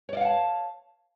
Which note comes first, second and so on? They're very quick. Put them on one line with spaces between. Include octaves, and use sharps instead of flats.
C#5 D5 F5 F#5 A5